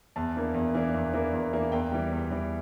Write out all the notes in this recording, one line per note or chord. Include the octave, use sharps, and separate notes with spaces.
E2 A5
E3 A#3 D4
E2
E3 A#3 D4
E2
E3 A#3 D4
E2
E3 A#3 D4
E2 G5
E3 G3
E2
E3 G3